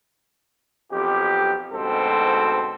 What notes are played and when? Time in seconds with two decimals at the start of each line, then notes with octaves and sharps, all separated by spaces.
0.92 B1 F2 G4
1.72 D2 G#2 B2 C4 A4